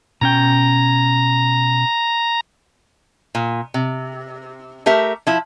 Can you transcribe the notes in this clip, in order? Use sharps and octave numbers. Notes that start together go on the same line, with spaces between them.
B2 C#4 G5 A#5
A#2
C3
A3 G4 A#4 E5
F3 E4